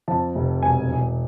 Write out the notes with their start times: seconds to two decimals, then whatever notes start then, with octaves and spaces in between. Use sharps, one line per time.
0.08 F2 A5
0.35 F1
0.62 E1 G#5
0.89 E1